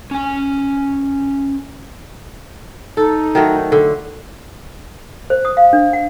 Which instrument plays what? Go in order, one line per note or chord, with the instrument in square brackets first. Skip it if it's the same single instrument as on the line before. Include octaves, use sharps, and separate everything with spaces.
[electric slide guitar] C#4 G#5
[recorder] D#4 [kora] A4
[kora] D#3 F#3 A3
D3
[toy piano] C5
D#6
F5
D4
F#5